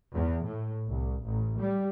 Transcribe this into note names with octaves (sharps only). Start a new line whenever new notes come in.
E2
A2
C2
A1
G3